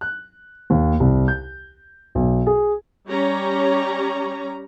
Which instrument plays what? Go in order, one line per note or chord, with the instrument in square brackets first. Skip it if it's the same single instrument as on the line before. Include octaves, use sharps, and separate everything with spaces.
[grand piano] F#6
D#2
C2
G6
B1
G#4
[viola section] G3 C#4 G4 C#5 A#5